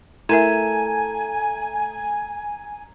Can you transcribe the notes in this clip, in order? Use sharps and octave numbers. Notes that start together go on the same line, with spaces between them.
A3 E4 A#4 E5 G#5 A#5 G#6 D#7